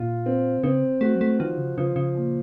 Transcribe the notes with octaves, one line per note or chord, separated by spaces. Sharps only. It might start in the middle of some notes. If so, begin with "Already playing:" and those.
Already playing: A#2 F4
C4
C3
C#3 C4
A3 F#4
F#3
A3
D#3 F3
C#3
C#3 F3
C#3
A#2